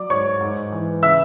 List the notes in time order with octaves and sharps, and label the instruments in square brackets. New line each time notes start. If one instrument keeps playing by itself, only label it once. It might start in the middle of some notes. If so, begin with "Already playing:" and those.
Already playing: [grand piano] F#3 D5 D6
G#2 C#5 C#6
G#2
E3
C#3 E5 E6